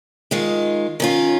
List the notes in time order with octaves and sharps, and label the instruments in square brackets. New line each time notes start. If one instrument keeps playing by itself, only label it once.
[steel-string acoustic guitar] D#3 G#3 F4
D#3 C#4 F4